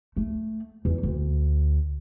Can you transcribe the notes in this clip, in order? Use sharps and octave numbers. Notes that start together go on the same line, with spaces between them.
A3
E2
D2